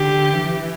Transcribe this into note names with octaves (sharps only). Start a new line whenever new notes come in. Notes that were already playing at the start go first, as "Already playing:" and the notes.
Already playing: D3 G4
E3